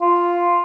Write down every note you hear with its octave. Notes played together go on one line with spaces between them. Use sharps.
F4